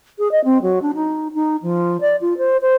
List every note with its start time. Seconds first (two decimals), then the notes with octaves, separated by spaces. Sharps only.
0.19 G#4
0.32 D#5
0.45 C4
0.62 F#3
0.82 D4
0.95 D#4
1.35 D#4
1.62 F3
2.01 D5
2.21 F4
2.38 C5
2.62 C5